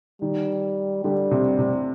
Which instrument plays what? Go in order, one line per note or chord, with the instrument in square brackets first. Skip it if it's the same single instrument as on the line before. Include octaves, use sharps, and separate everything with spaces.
[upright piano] D#3 [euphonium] G3
[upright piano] D3 [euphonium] G3
[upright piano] C3
C3